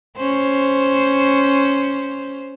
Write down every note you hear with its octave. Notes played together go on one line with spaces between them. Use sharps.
C#4 C5